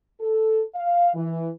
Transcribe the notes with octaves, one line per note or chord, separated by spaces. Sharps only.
A4
F5
E3